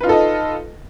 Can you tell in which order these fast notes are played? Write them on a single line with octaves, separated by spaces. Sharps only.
B4 F4 D#4 A4 D#5